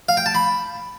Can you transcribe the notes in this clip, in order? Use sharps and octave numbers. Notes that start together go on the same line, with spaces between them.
F5
G5
A5
B5